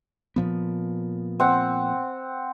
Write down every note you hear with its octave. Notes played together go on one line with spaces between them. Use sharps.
A#2 F3 B3
C4 F#5